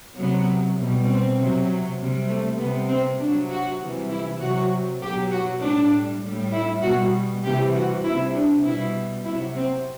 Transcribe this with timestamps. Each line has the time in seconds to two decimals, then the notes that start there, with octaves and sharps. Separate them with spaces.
0.16 C3 F#3 B3
0.77 B2 G3
1.08 C4
1.38 C3 F#3
1.98 C3 G3
2.28 A3
2.59 C3 G3 B3
2.89 C4
3.19 C3 F#3 D4
3.49 F#4
3.79 C3 E3 G3
4.10 E4
4.40 C3 F#3 F#4
5.01 B2 F#3 G4
5.31 F#4
5.61 A2 G3 D4
6.23 A2 G3
6.53 E4
6.83 B2 G3 F#4
7.43 C3 E3 G3 G4
7.74 F#4
8.04 C3 G3 E4
8.34 D4
8.64 B2 G3 E4
9.25 C3 F#3 E4
9.55 C4